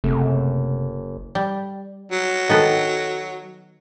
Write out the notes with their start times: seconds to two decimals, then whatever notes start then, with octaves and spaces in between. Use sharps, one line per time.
0.04 F#1 C3 A3
1.35 G3
2.12 F#3
2.49 D#3 B3 A4